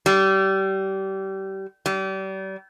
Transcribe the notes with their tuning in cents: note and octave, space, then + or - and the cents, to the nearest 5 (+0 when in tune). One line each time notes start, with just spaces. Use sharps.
G3 -25
G3 -35